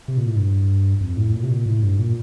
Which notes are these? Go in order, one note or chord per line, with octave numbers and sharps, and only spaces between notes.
C3
A#2
A2
G2
F2
A2
A#2
C3
A#2
A2
G2
A#2